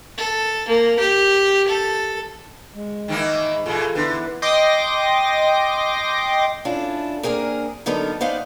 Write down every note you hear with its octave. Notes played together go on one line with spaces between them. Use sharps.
A4
A#3
G4
A4
G#3
D#3 E3 A#3
G#2
A#2 E3 F4 G#4 A4
D3 E3 B3 B4
D#5 G5 C6 D6 A#6
C#4 D4 E4 F4 A4
A#3 C4 D4 G#4 A#4
D3 F#3 B3 D#4 A4 A#4
B3 D#4 C5 D5 F5 F#5